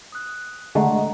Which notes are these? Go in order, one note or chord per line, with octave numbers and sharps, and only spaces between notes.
D#6 F#6
D3 G#3 A3 D#5 F#5 A#5